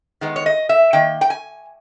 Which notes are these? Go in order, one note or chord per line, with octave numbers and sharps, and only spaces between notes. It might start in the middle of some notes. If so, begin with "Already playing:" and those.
D#3 G#3 B3
C#5
D#5
E5
D#3 A#3 G5
G5
G#5